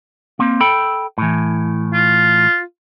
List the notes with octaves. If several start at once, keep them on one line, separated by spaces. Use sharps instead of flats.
A#3 C4
A4 G5 B5
A2 E3
F4